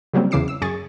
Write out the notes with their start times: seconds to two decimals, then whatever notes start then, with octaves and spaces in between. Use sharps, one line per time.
0.13 C#3 F#3 G3 A#3 C4
0.31 E2 C#3 E3 D6 C7 E7
0.48 E6
0.62 F#2 G#4 C#6 A6